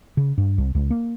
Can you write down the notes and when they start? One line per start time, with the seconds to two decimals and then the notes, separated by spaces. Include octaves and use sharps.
0.17 C#3
0.38 G2
0.58 C2
0.75 C#2
0.90 A#3